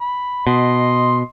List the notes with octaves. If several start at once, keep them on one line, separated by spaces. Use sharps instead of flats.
B5
B2 D#5 C6